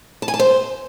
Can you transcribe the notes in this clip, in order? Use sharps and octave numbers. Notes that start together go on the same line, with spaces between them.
A5
G#5
A5
C5